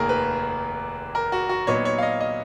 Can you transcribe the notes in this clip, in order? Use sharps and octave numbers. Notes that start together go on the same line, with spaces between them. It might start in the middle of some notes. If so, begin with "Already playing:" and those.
Already playing: F1 D#2 D#3 A#3 G#4 A#4
B4
A#4
F#4
F#4
A#2 F#3 B3 D#4 C#5
C#5
F5
D#5
D#5